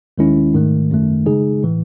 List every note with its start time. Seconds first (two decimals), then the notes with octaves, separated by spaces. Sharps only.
0.18 D#2 D#3 G#3 C#4 E4
0.54 G#2 D#3 A3
0.90 G#1 F#2 D#3 A3
1.26 C#3 G#3 D#4 G#4
1.63 A2 E3